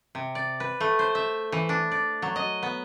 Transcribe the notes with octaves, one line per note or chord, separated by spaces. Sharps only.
C3
D5
B4
A3
C5
E5
E3
D4
D5
F#3
D#5
B3